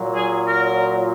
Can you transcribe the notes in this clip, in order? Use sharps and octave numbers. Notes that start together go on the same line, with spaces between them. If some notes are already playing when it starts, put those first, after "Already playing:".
Already playing: A#2 F#3
G#4
A#4